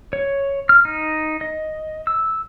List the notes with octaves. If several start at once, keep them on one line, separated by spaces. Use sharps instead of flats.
C#5
F6
D#4
D#5
E6